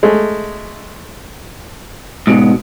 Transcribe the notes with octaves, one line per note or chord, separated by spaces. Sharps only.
G#3 A3
G#2 B2